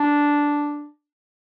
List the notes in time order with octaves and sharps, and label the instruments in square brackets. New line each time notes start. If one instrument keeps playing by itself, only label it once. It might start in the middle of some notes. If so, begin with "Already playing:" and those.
Already playing: [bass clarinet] D4